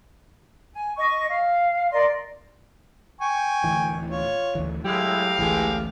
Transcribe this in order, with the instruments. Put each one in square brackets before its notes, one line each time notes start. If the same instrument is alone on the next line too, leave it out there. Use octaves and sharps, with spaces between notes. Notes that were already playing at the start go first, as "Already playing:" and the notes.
[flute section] G#5
D#5 C#6
F5
A#4 D5 D#5 C6
[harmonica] G5 G#5 C#6
[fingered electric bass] D1 D2 E3
[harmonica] F4 C#5
[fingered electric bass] D2 D3 E3
[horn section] A2 G4 F5 [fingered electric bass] F#3 [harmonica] G#3 E4
[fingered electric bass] A1 D2 [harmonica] E3 G#3 G#4